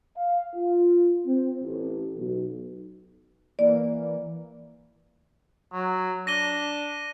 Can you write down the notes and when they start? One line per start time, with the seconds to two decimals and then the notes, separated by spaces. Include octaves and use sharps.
0.16 F5
0.54 F4
1.25 C4
1.63 A1
2.16 B1
3.59 E3 A#3 D5
5.73 F#3
6.27 D4 A#6 D#7 G7